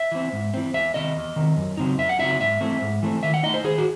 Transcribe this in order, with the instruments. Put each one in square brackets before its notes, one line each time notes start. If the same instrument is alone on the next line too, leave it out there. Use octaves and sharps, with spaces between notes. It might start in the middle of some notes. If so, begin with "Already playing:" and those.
Already playing: [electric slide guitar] E5
E3 C4
G#2
E3 C4
E2 E5
C3 D#3 D#5
E2
C3 D#3
F#2
C#3 F#3 C4 D#4
F#2 E5
F#5
C#3 F#3 C4 D#4 E5
G#2 E5
E3 A3 C4
G#2
E3 A3 C4
D#3 E5
F#5
A3 D#4 D#5
C5
D#3 G#4
F#4